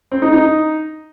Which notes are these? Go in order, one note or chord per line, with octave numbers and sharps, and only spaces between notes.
C4
D#4
D#4